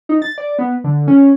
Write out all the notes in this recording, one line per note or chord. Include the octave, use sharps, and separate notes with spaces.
D#4
A6
D5
B3
D3
C#4